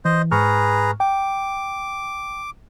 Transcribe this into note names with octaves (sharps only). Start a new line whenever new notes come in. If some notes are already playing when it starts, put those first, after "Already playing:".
E3 C5 D#5
G#2 G#4 B4 A#5 C#6 F6
G5 D6